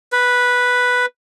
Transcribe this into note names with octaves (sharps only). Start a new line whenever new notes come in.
B4